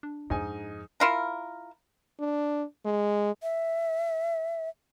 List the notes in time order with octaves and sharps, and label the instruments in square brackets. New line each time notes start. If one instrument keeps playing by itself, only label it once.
[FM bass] D4
[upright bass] F2 [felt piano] G#2 [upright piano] D#4 G#5
[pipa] E4 F4 A#4
[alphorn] D4
G#3
[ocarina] E5